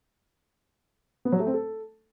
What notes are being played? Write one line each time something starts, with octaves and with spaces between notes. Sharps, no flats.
B3
F#3
A3
C4
A4